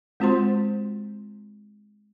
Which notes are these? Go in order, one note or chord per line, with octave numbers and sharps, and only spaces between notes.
G#3 C4 F4 F#4 C5 C6